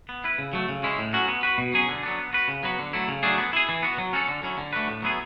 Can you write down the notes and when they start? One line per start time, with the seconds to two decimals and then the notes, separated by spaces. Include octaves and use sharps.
0.09 B3
0.24 E4 B4
0.38 C#3
0.53 F#3 A3
0.69 C#3
0.83 G#3 C#4 E4
0.99 A2
1.13 F#3 C#4 F#4
1.28 B3
1.43 F#4 B4
1.58 B2
1.74 F#3 C#4 G#4
1.89 D3
2.03 F#3 B3 D4
2.18 B3
2.33 F#4 B4
2.48 C#3
2.63 F#3 B3 F#4 B4
2.79 D3
2.93 F#3 A3 E4
3.08 C#3
3.23 F#3 A3 D4 G#4
3.38 B3
3.53 E4 G#4
3.69 E3
3.83 B3 F#4
3.98 F#3
4.13 C#4 F#4 A4
4.28 D3
4.43 F#3 C#4 E4
4.58 D3
4.73 A3 D4 F#4 B4
4.88 A2
5.03 F#3 B3 E4 G#4